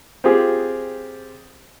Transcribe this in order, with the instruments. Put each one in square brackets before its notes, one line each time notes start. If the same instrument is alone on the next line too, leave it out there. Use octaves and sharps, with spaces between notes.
[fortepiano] C4 F4 G4 G#4